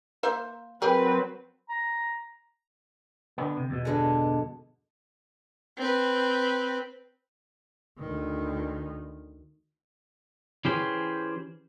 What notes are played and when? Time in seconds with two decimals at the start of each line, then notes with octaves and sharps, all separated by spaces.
0.23 A#3 C5 E5
0.82 F#3 C4 G4 G#4 A#4 B4 G5
1.69 A#5
3.38 D3 B3
3.57 C3
3.70 E2 B2
3.85 G2 D3 G#3
5.78 C4 B4
7.99 D2 D#3
10.65 E3 C#4 G4 G#4 C5